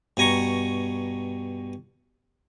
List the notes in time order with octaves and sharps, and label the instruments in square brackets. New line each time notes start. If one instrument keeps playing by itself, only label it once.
[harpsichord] G2 B2 G#5 A#5 C#6